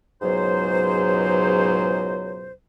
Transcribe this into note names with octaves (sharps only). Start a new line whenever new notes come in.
C#2 G#2 B2 F#3 C5